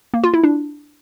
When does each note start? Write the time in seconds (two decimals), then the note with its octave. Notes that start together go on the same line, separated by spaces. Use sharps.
0.14 A#3
0.24 F4
0.34 E4
0.44 D4